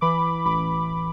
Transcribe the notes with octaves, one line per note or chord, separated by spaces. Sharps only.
E3 B5 D6
A1 B5 D6